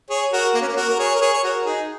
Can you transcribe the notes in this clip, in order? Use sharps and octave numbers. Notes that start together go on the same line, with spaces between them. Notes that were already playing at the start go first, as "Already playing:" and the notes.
G#4 C#5
F#4 A#4
A#3
C#4
A#3
F#4 A#4
A#4
G#4 C#5
A#4
G#4 C#5
C#5
F#4 A#4
D#4 G#4